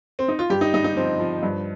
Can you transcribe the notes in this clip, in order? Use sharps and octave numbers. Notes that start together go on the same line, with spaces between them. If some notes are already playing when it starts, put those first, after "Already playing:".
C4
D#4
F4
G2 G4
D#4
G2 D#4
D#4
F3 C4
F3
G2